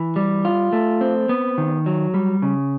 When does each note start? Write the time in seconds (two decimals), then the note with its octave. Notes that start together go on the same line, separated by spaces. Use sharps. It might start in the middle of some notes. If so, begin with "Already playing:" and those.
Already playing: E3
0.16 G3
0.45 F4
0.73 A3
1.01 C4
1.29 B3
1.58 D#3
1.86 F#3
2.14 G3
2.42 C#3